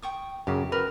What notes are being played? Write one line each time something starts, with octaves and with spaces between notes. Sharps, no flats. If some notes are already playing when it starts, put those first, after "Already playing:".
G5 C#6 D#6
F#2 C#3 G4
A#4 B4